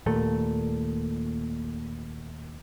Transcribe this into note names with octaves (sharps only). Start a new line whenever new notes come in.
D#2 A#2 A3